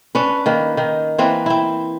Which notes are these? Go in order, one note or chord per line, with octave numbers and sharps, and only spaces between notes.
C#4 D4 B4
D#3 A#3 B4
D#3 D#4
E3 A#3 C4 B4
C4 E4